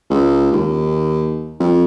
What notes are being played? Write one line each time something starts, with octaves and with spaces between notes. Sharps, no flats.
C#2
D#2
F2